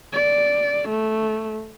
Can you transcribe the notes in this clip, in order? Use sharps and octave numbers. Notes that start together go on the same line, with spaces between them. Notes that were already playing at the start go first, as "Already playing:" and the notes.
D5
A3